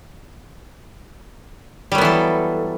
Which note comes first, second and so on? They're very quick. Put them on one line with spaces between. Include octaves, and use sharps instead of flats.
G3 F#3 B3 E3 A4